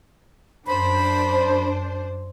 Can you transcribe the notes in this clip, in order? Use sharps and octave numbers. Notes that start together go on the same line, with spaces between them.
F#2 D4 C5 B5